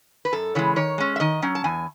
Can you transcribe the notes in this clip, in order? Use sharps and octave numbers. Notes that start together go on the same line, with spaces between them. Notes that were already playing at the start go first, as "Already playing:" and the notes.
B4
F#2 A4
C#3 E3 G#3 C#5
D#3 C#5
G#3 C#4
E5
D#3 D#5
F#3 C#4
A5
E2 G#5